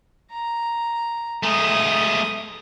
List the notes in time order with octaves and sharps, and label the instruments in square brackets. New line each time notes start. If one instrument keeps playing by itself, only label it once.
[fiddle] A#5
[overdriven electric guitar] G#3 A3 [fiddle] D#6